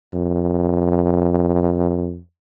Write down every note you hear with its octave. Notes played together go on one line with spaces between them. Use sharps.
F2